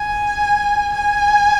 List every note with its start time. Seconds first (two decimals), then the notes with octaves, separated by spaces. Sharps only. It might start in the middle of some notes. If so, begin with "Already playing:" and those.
Already playing: G#5
0.93 G#5